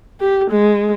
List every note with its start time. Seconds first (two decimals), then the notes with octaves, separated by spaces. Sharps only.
0.20 G4
0.50 G#3